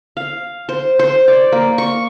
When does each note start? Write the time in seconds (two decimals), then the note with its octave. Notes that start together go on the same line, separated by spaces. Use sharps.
0.17 F5
0.69 C5
0.99 C5
1.28 D5
1.52 A#3
1.78 C#6